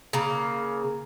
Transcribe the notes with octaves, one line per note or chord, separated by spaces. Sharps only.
C#3 A#3